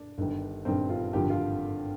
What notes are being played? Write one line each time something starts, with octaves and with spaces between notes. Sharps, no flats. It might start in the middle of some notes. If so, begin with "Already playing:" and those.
Already playing: D4
G1 G2 D#3 G3
G1 G2 D#3 G3 C4
F4
G#1 G2 D3 F3 G4
F4